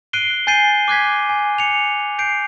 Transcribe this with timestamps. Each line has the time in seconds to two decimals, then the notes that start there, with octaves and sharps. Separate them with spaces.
0.13 F#6 C7 D7 D#7 G7
0.47 G#5 G6 A6 C7 D#7 G7
0.88 D6 F#6 G#6 B6
1.29 G#5
1.58 C#7 F7
2.19 G6 C7 D7